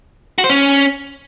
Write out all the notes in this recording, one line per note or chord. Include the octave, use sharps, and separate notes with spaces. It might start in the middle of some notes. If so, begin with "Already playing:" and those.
F#4
C5
C#4